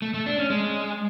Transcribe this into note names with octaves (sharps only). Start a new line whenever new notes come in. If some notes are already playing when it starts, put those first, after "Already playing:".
A3
A3
D4
C#4
G#3